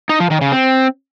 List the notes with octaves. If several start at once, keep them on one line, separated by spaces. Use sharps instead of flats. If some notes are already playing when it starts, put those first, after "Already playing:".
D#4
F3
D#3
C#3
C4